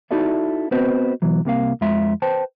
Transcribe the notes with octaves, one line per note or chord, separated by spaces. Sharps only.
D#4 E4 F#4 A4 D5 E5
B3 C4 F#4 B4 C5 D#5
B2 E3 F#3
C2 C3 A#3 F5
F2 F3 G#3 E5 C6
B4 C5 G5 A5